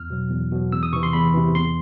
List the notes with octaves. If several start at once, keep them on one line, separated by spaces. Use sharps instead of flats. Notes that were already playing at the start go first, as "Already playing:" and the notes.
Already playing: E2 F6
B2 F#3
E2
B2 F#3
E2 E6
D#6
C3 E3 C#6
C6
E2 B5
C3 E3
E2 C6